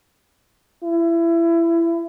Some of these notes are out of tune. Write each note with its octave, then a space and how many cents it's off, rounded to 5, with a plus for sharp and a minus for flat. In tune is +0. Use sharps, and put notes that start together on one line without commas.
E4 +25